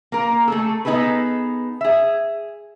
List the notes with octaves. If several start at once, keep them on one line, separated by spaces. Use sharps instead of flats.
A#3 A#4
A3 G#4 A4
B3 D#4 G#4 A4 B4
G#4 E5